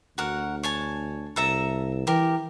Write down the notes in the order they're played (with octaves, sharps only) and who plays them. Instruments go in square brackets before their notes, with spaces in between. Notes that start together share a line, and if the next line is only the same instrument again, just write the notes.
[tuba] D2 [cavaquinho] F#4 A#4 F#5
[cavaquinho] C#5 G#5 A5
[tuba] C2 [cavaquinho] A4 E5 A#5
[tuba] E3 [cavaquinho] G4 A#4